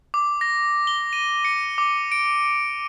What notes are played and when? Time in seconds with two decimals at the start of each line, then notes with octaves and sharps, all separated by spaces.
0.14 D6
0.41 A#6
0.87 G7
1.13 D#7
1.45 C#7
1.78 D6
2.12 D7